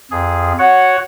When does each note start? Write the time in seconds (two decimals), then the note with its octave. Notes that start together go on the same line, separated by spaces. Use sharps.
0.11 F2 G#4
0.59 F#4 C#5 F#5